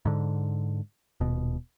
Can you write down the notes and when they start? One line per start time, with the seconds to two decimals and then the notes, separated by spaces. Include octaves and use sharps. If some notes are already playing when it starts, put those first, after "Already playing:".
0.05 G#2 D3
1.20 D#1 B2